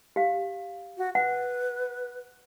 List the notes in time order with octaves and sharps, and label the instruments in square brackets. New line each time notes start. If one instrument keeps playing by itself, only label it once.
[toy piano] G4 F5
[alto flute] F#4
[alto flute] B4 [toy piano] F#5